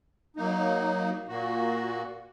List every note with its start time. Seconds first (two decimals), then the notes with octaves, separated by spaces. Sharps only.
0.37 F#3 A#3 D#4
1.28 A#2 A#3 F#4